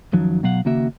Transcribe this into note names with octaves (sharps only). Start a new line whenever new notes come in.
F#2 D#3 F3 F#3
B2 F#3 F5 F#5
D#2 C#3 A#3 F#4 E5